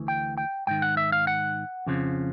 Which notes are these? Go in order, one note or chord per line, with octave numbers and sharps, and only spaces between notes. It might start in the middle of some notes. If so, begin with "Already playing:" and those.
Already playing: D2 E3
G5
G5
G#2 D#3 G5
F#5
E5
F5
F#5
F2 C#3 F3